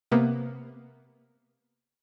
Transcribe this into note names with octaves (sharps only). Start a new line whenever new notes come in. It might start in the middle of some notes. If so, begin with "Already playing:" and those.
C3 A#3 B3